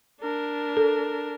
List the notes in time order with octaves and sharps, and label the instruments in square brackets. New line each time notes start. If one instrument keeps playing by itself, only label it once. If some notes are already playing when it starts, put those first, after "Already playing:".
[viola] D4 A#4
[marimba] A4